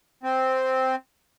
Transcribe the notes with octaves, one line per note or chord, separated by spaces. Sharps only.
C4